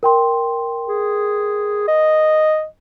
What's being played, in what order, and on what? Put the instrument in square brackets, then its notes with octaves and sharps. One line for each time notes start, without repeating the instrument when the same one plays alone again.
[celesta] A#4 G5 C6
[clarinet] G#4
D#5